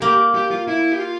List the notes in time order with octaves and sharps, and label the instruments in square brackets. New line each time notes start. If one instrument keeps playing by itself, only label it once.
[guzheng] A#3 [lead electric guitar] G4
[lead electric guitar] G4
F4
E4
G4
F4